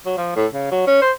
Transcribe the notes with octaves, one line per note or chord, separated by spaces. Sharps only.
F#3
F3
A2
C#3
F#3
C#4
C5